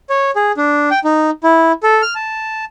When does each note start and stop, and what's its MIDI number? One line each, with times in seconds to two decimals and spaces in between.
0.09 0.31 73
0.36 0.52 68
0.57 0.90 62
0.91 0.99 79
1.04 1.30 63
1.44 1.72 64
1.83 2.02 69
2.02 2.14 89
2.15 2.65 81